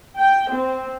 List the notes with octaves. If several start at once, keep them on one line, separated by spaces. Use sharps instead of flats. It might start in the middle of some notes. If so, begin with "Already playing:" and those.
G5
C4